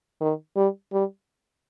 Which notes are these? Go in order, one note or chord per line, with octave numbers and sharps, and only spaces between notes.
D#3
G3
G3